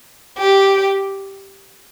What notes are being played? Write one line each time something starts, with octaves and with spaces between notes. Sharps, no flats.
G4